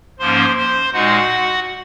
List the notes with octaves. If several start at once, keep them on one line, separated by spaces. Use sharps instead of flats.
G#2 F3 A#3 C#4 C5 C6
C5 C6
A#2 G#3 D#4 F#4 F#5